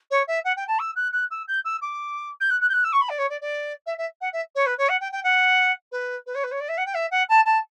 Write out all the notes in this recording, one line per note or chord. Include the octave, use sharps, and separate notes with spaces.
C#5
E5
F#5
G5
A5
E6
F#6
F#6
E6
G6
E6
D6
G6
F#6
F#6
G6
F#6
E6
C#6
B5
D5
C#5
D5
D5
E5
E5
F#5
E5
C#5
B4
C#5
F#5
G5
G5
F#5
B4
B4
C#5
B4
C#5
D5
E5
F#5
G5
E5
F#5
A5
A5